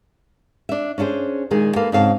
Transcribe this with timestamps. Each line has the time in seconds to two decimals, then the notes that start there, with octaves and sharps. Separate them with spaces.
0.69 D4 E5
0.98 C#4 D4 E4 G#4 C5
1.51 A#2 D#3 G#3 G#4
1.76 A#3 A4 B4 F5
1.92 G#2 C#3 C4 F5 A5